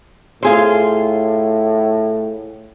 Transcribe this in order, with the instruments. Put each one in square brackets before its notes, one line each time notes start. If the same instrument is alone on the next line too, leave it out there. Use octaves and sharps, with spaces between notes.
[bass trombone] A2 [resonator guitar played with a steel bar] F4 G#4 C5